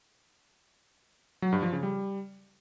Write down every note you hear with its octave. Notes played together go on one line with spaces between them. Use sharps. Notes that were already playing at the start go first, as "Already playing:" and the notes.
F#3
G2
F3
C#3
G3